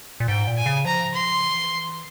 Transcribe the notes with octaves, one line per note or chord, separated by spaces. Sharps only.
A#2
G#2 G5
A#2
G#5
C#3
F3 A#5
C6
E3